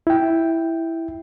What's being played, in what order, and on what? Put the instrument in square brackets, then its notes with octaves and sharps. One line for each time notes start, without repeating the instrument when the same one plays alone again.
[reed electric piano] E4 G5